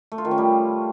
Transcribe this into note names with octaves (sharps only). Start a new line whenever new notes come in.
A3
F4
D#3
C#4
G3